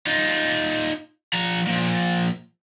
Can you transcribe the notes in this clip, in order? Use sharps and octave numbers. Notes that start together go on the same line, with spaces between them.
D#4 F4
F3 A#5
F3 A#3